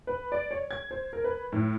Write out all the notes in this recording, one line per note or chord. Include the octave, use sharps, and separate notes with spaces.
B4
D5
C#5
G#6
C5
A#4
B4
A2